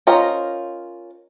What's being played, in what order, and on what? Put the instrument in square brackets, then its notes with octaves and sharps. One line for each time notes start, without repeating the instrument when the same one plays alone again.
[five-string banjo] C#4 F4 A#4 C5 D#5